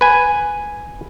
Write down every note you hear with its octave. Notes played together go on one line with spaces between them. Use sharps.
B4 G#5